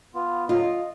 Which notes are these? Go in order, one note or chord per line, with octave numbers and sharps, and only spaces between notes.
B3 F4
D3 F#3 F4 D#5
D#5